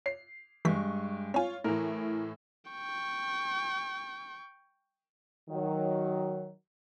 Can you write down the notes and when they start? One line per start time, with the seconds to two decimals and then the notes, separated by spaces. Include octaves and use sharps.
0.06 C#5 C7
0.65 G2 E3 G#3 A3 C#6 B6
1.34 C4 F4 C#5 G#5
1.64 A2 E3 A#4
2.71 G5 C#6
5.50 D#3 F#3